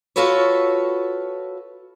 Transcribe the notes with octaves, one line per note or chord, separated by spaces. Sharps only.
F4 F#4 A4 B4 C#5